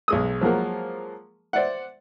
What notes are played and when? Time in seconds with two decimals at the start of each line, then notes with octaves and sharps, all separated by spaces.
0.08 B1 G#3 D#6
0.41 F3 F#3 G#3 A#3
1.53 C5 D5 E5 F#5